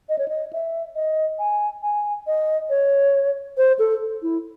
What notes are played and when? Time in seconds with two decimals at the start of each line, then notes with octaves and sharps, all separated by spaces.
0.09 D#5
0.19 C#5
0.28 D#5
0.53 E5
0.95 D#5
1.39 G#5
1.82 G#5
2.27 D#5
2.70 C#5
3.57 C5
3.79 A4
4.22 E4